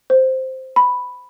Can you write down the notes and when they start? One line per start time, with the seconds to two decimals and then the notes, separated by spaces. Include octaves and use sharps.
0.10 C5
0.76 B5